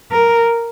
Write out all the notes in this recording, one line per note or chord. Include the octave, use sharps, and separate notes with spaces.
A#4